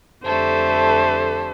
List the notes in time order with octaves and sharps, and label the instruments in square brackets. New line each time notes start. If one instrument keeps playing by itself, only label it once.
[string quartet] F2 D3 G4 [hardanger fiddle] A3 A4 [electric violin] C5